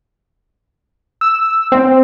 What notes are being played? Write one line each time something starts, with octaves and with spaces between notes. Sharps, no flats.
E6
C4